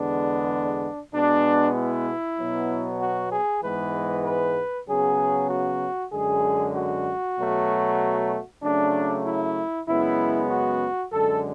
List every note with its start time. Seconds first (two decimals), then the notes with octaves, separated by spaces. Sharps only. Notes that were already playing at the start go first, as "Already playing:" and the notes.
Already playing: E2 D3 G#3 B3 D4
1.13 B2 G#3 B3 D4
1.75 E4
2.38 B2 F#3 B3
3.00 F#4
3.32 G#4
3.63 G#2 E3 G#3 B3 B4
4.25 B4
4.88 C#3 F#3 B3 G#4
5.50 F#4
6.12 F#2 D3 G#3 G#4
6.76 F#4
7.38 B2 F#3 A3
8.63 C#3 F#3 A3 D4
9.25 E4
9.87 F#2 C#3 G#3 B3 E4
10.50 F#4
11.12 F#2 D3 G#3 A4